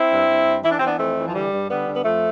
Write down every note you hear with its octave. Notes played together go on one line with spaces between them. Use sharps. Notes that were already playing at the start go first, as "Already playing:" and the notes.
Already playing: C4 E4
G2
G2
G2
E3 E4
D4
E3 C4
B3 D4
F2 A3 C4
E3
F3
D3 G3
G2
D3 G3 B3
D3
B3
F2 F3 A3